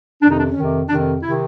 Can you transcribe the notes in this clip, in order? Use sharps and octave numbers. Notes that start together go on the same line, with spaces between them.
F2 C3 D#3 D4
D#4
D4
C#4
F2 C3 D#3
F2 C3 D#3 D4
C3 D#3 E4